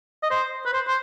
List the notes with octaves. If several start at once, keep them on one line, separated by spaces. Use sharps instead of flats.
D#5
C5
B4
C5
C5